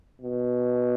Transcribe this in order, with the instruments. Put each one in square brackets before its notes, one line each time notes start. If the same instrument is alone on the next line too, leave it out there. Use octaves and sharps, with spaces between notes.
[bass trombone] B2